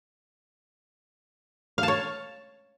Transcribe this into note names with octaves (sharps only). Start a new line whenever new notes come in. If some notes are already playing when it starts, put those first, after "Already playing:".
F5
A5
C#5